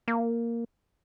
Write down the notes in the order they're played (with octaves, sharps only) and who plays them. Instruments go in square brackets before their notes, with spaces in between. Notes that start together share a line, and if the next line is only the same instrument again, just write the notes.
[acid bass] A#3